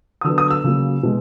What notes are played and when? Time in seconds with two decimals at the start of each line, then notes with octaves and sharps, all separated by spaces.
0.21 D#6
0.24 D3 F#3 B3 E6
0.38 D#6
0.51 E6
0.64 C#3 F#3 A#3
1.03 B2 G#3